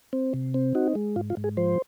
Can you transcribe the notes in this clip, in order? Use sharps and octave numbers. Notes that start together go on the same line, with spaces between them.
C4
C3
C4
D#4 F#4
G#3
G#2 F4
F4
G#2
G#4
F3 C5